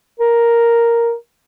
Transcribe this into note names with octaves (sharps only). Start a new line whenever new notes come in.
A#4